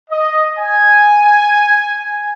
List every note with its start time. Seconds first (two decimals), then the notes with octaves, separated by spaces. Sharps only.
0.11 D#5
0.57 G#5